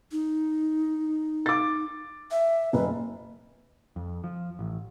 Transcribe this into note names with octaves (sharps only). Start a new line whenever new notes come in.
D#4
D6 A6
E5
F#1 B4
F2
F3
A1